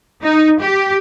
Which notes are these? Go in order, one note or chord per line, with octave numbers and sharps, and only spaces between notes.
D#4
G4